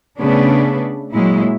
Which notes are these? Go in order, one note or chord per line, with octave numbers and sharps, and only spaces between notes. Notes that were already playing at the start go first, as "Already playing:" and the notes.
C#3 A3 B3 D4 B4
A#2 F#3 G#3 E4